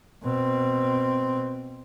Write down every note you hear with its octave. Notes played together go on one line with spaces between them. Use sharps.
B2 C4